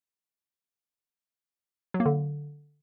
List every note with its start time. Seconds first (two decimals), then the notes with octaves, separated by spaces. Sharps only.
1.94 F#3
2.00 A#3
2.06 D3